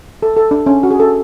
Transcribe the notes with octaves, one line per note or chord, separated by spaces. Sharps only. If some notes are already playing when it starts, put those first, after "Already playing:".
A4
A4
D4
C#4
F#4
G#4
A4